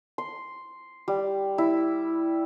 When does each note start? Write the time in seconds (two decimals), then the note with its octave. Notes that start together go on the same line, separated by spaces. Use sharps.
0.18 C6
1.08 G3
1.58 E4